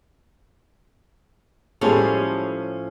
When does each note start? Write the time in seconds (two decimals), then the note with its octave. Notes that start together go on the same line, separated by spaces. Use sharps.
1.81 A2 F3 G3 G#3 C#4 A4